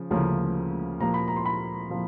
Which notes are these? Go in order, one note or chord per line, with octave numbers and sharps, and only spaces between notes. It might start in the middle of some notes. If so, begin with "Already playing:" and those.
Already playing: C#3 F3
D2 C#3 F3 A#3 C#4
A#2 F3 A#3 A#5
B5
A#5
C6
B5
A#2 F3 A#3